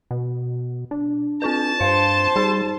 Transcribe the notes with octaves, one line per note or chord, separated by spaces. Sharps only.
B2
D4
C4 F4 B4 A5
G2 C5 F5
G3 D#4 G#4